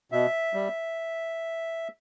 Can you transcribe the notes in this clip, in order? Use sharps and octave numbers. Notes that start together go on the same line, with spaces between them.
B2 E5
G3